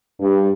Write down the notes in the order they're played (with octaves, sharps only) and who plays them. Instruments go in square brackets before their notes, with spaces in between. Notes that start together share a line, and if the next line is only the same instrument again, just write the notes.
[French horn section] G2